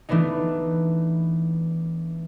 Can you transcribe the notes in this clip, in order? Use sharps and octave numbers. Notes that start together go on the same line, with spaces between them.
E3 A3 B3 D4 D#4